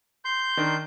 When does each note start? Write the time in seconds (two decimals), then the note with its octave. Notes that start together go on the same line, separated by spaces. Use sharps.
0.25 C6 G6
0.57 D#3 D4 A#4